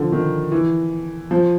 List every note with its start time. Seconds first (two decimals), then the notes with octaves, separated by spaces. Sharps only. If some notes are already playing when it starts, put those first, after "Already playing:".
Already playing: D3 F3
0.12 D#3
0.52 E3
1.31 F3